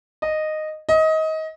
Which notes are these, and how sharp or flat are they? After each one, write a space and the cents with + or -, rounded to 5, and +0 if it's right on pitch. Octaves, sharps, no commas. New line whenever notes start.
D#5 -10
D#5 +25